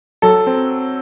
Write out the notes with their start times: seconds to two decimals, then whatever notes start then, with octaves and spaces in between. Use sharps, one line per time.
0.22 F#3 A4
0.47 C4